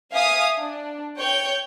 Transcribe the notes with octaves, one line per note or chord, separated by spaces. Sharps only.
E5 F5 G#5 D#6
D4
C#5 G5 G6